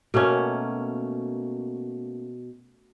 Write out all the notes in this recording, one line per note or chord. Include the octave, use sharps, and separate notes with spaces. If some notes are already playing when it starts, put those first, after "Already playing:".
B2 A3 A#3 C#4